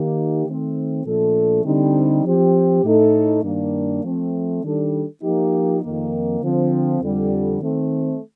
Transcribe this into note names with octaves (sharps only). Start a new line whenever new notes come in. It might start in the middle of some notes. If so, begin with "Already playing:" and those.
Already playing: D#3 A#3 D#4 G4
D#3 A3 C4
A#2 F3 A3 D4 A4
D3 G3 C4 D#4
F3 C4 G4
A2 A3 D#4 A4
G2 D#3 A#3 D4
F3 A3 C4
D#3 G3 D4 A4
F3 A#3 D#4 G4
F2 D#3 A#3
D3 F3 C4
F2 D3 G3
D#3 A3 C4